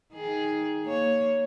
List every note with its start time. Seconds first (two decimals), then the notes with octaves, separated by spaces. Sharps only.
0.14 D#3 G#4
0.84 A#3 C#5